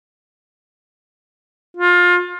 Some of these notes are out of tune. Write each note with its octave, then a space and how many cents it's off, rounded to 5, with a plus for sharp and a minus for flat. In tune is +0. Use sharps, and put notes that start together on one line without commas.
F4 +25